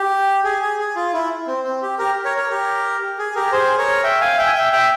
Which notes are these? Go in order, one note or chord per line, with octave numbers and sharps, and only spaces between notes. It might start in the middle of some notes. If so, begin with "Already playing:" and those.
Already playing: G4
G#4
G#4
G#4
F4
E4
C4
C4
G4
G4 A#4
A#4 C#5
A#4 C#5
G4 A#4
G#4
G4 A#4
G#4 C5
A#4 C#5
E5 G5
F5 G#5
E5 G5
G#5
E5 G5
E5 G5